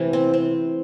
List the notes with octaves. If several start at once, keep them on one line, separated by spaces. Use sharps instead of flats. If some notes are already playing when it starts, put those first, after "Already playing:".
Already playing: C3 E3 A3
C4
C4